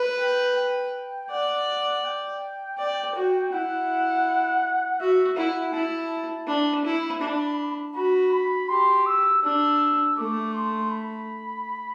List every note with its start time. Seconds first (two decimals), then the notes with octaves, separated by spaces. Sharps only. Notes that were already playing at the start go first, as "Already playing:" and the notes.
Already playing: B4
0.20 G5
0.57 G5
1.30 D5 F#5
2.05 G5
2.78 D5
3.15 F#4
3.52 E4 F#5
5.00 F#4 E5
5.37 E4 F#5
5.73 E4 A5
6.47 D4 B5
6.85 E4
7.21 D4
7.95 F#4 B5
8.32 B5
8.69 G4 C6
9.07 E6
9.43 D4 E6
10.17 A3 D6
10.54 C6
10.90 B5